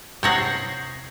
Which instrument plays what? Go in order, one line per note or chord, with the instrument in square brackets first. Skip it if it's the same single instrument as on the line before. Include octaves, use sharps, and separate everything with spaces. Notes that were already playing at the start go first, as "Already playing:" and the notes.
[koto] C3 C#5 F#5 [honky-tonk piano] G6 A#6 C7